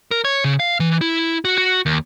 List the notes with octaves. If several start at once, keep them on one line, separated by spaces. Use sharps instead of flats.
A#4
C#5
C#3
F5
E3
E4
F#4
F#4
D#2